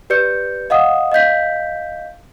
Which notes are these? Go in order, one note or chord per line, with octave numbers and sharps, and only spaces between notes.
G4 B4 D5 G6 C#7
D#5 F5 F#5 D#6
D#5 F5 G6 B6